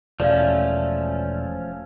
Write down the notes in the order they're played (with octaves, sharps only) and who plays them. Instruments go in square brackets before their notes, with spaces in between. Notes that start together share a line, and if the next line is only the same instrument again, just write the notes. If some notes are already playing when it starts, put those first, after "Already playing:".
[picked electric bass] E1 [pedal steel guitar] F3 A3 C#4 [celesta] D5 F5